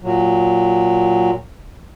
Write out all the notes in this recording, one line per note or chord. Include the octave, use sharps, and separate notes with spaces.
A#2 F#3